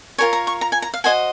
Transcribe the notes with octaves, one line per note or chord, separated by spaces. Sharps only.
F4 A#4 C#5 G#5
A#5
C#6
A#5
G#5
A#5
F5
F#4 C5 D#5 G#5